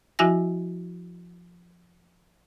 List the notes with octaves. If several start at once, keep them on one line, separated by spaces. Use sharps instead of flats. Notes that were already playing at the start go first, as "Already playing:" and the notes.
F3 E4 F#4 E5 G#5 A#6